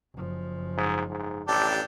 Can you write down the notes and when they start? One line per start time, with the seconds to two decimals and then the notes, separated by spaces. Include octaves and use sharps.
0.14 F#1 F3
0.78 G#2
1.10 G#2
1.48 A1 D4 G4 A4